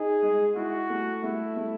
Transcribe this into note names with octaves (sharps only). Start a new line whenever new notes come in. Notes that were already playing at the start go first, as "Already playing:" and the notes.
Already playing: D#4 G#4
G#3
E4 F#4
A3
A3 E4
A3